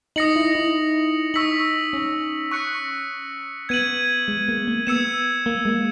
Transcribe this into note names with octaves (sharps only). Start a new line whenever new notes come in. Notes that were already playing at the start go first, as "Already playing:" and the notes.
D#4 D#6 A#6 C#7 F#7
E4
E4
D#4 C#6 E6 B6 F#7
C#4
C#6 F#6 C#7
B3 G#6 D#7 F#7
G#3
A#3
A#3
B3 E6 G#6 C#7 E7
A#3
G#3